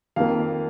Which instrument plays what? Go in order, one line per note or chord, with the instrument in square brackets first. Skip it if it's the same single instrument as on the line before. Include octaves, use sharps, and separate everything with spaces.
[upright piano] F2 D#3 A#3 F5